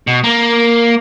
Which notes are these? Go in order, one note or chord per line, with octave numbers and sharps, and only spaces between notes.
B2
A#3